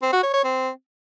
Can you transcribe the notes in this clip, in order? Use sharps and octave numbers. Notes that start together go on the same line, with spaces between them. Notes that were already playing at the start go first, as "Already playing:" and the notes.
C4
F#4
C#5
C#5
C4